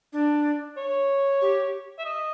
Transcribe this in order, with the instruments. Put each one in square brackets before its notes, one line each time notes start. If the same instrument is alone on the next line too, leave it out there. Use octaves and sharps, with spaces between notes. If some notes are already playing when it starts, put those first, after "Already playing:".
[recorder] D4
[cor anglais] C#5
[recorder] G4
[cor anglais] E5
D#5